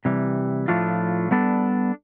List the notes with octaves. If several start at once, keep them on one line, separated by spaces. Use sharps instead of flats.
C3 E3 G3
A2 F3 A3 D4 F4
G3 B3 D4 A4